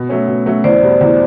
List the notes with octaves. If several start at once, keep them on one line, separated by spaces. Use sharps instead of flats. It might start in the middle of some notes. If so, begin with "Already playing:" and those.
Already playing: B2
F#3 A3 C#4
B2
F#3 A3 C#4
E2 C5 D5
B2 G3
E2